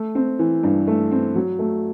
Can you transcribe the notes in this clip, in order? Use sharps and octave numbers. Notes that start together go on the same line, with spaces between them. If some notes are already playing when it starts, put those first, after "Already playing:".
Already playing: A3
C4
E3
G2
A3
C4
F#3
A3